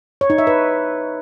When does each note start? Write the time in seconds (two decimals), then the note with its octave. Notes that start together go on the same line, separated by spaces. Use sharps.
0.21 C#5
0.30 D#4
0.38 E5
0.47 B4